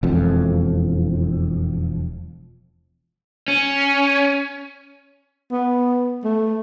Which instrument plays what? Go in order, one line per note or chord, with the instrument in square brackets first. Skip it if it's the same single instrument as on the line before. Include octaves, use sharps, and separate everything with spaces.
[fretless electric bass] E1 F2
[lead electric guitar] C#4
[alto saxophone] B3
A3